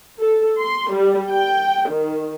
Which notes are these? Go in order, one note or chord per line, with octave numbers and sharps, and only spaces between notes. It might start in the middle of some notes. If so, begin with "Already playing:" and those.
A4
C6
G3
G5
D#3